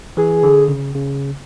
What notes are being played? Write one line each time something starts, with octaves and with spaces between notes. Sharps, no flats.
E3 G#4
D3
C#3
C#3